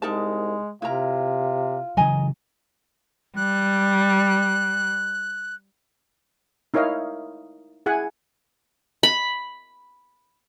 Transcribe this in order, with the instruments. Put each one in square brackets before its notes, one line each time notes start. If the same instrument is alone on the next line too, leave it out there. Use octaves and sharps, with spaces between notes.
[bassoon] C2 [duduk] G#3 [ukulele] D#4 A#4 A5
[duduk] C3 [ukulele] E4 A#4 A#5 [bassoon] F4
[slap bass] C#3 E3 F#3 [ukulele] D#5 G#5 A#5
[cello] G3 [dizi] F#6
[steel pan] D#4 E4 A#4 C#5 D#5 F5
E4 G#4 F#5 G#5
[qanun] B5